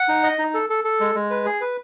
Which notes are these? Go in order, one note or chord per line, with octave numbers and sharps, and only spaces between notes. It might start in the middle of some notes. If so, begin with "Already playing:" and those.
Already playing: F#5
D#4
D#5
D#4
A4
A4
A4
G#3
G#3
B4
G#4
B4